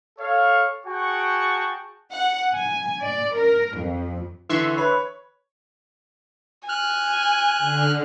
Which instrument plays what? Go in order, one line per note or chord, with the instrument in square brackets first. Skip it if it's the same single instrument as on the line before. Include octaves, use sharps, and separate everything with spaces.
[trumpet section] A4 C#5 F5
F#4 G#4 F#5 G5 A5 C#6
[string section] F#5
G#5
D5
A#4
F2
[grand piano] D3 E3 [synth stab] E5 C6 C#6
[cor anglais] B4 [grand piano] C#5
[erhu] G#5 [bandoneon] F6 F#6
[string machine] D3